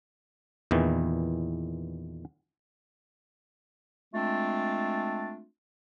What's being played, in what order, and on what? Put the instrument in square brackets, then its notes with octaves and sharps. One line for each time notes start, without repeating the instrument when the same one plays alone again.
[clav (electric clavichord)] E2 A#2 D#3 E3
[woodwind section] G#3 A3 C4 D4 F4